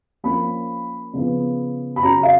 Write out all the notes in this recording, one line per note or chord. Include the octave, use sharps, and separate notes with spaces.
F3 A#3 C#4 B5
C#3 F3 B3
B5
C#3 F#3 C#4 A#5
F5